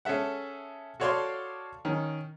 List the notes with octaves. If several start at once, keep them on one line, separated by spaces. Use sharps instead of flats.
C#4 G#4 A4 E5 F#5
F#4 A4 C#5 D5 F5 C6
D#3 C#4